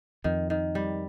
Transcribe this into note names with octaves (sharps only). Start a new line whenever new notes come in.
F2 D#3
D#3
G3